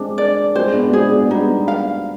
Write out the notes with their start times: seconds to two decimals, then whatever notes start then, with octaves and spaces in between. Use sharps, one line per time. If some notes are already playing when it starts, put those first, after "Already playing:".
Already playing: G#3 C4 D4
0.18 D5
0.55 G#3 C4 C5
0.74 B3 D4
0.85 D4
0.93 G#3 C4 G#4
1.12 B3 D4
1.31 G3 B3 D#4
1.68 F5